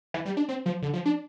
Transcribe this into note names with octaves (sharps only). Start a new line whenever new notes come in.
E3
G3
D4
C4
F3
D3
F3
D4